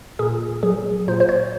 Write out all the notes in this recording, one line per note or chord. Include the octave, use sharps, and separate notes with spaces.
A#2 G#4
F#3 G#4
A#2 C5
C5
C#5